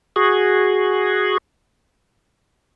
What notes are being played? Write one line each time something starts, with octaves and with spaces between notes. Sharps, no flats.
F#4 G#4